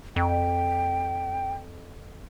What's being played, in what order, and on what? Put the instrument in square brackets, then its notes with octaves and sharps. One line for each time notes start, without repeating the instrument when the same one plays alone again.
[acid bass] F2 [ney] G5